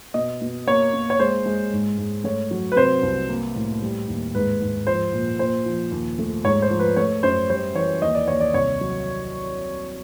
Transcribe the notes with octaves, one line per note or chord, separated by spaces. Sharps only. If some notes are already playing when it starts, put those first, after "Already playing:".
B2 D#5
B2
A#3 C#5
A#3
C#5
G#3 C5
G#3
G#2
G#2
A3 C#5
F#3
B4
C3 C5
C2
A#3
A2
G3
D#2
G#2 B4
G#2
F3 C5
A#2
A#2 C5
F3
D#2
A3
G#2 C#5
C5
F3
B4
A3 C#5
F#2 C5
G3 C5
E3 C#5
D#2 D#5
D5
D#2 C#5
D5
C2 C#5
F#3